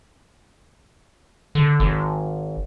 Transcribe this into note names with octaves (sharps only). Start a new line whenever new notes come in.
D3
G#1